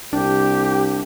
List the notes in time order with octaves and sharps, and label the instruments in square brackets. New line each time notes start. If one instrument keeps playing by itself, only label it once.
[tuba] C2 [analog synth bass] D4 [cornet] G4